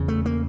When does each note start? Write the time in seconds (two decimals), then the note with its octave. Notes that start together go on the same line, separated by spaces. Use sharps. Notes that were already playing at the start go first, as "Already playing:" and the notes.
Already playing: E2 C#3
0.08 A3
0.26 A#3